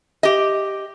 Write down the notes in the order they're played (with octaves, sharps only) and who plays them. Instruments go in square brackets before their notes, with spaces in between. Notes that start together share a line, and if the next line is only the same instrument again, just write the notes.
[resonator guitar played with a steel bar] G4 D#5